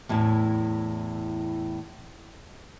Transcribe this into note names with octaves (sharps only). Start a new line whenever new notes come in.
E2 A2 E4 A5